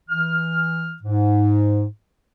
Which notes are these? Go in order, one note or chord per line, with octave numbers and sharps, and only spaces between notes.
E3 F6
G#2